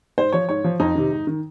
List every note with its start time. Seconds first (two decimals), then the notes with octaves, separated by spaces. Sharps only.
0.18 G#2 C5
0.33 F3 C#5
0.49 G#2 C#5
0.64 F3
0.80 F2 D#4
0.95 C3 D#3
1.12 G#2
1.27 D#3